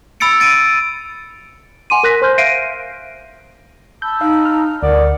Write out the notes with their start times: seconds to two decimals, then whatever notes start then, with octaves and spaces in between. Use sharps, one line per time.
0.20 B5 E6 A6 C#7 D7
0.40 A6 D7 D#7
1.90 F#5 G#5 C6 D6 D#7
2.03 A#4 C6 F#6 A#6 B6
2.22 C5 C6 F6 G6
2.38 E5 F5 A#6 C7 D7 D#7
4.02 A5 B5 E6 G6
4.21 D#4 F5
4.45 F6
4.83 D2 A#4 D5 F#5